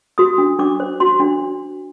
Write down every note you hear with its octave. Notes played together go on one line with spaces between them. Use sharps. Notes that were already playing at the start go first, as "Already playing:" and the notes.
F#4 D#6
D4
D4 D6
C5
F#4 C6
D4